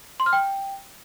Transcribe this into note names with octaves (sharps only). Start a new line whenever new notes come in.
C6
F6
G5